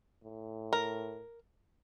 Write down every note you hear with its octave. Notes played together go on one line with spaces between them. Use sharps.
A2
A#4